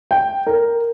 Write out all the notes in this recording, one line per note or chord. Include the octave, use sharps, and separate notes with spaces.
G5
A#4